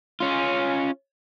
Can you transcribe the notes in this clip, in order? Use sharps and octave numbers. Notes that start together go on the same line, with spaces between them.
C#4 F4